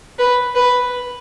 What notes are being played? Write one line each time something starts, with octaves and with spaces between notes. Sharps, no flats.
B4
B4